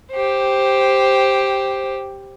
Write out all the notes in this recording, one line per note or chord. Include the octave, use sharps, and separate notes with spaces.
G4 C5